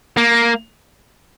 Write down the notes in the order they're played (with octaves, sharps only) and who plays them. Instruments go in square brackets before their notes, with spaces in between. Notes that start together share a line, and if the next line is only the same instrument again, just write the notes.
[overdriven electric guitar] A#3